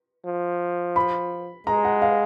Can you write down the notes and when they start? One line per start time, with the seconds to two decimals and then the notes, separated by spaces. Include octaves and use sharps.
0.25 F3
0.96 B5
1.67 G#3 A#5
1.85 F#5
2.02 F5